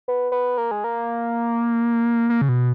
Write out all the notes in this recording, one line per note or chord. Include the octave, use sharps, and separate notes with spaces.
B3
B3
A#3
G#3
A#3
A#3
C#3
B2